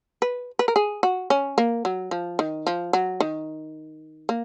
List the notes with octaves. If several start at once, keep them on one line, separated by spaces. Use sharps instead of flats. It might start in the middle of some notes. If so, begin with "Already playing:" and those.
B4
B4
A#4
G#4
F#4
C#4
A#3
F#3
F3
D#3
F3
F#3
D#3
A#3